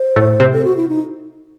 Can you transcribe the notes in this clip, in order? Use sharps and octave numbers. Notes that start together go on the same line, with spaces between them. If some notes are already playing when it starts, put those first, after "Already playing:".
Already playing: C5
A2 A3
C3 C4
A4
F#4
E4
D#4